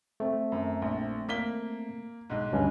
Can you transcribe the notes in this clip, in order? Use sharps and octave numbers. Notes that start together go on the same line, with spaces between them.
A3 C4
F#2
A#1
A#3 B6 G7
B1 G#2
D2 G2 C#4